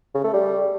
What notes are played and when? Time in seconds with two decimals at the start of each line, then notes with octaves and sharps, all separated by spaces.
0.14 C#3
0.24 A3
0.33 G3